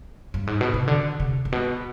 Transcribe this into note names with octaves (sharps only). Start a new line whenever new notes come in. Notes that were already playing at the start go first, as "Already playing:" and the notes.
G2
G#2
B2
C3
D3
C3
G#2
B2